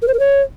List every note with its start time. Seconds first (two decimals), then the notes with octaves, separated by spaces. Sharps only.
0.02 A#4
0.08 C5
0.13 A#4
0.19 C#5